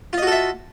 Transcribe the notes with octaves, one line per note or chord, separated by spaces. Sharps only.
F4 F#4 A4 D#5 E5